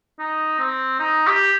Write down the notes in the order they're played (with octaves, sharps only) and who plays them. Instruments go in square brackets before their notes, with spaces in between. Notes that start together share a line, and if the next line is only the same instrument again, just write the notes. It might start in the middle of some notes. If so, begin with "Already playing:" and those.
[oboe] D#4
C4
D#4
G4